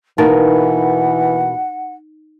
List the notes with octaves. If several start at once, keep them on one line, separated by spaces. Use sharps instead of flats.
B2 E3 A#3 D#4 A#4 F#5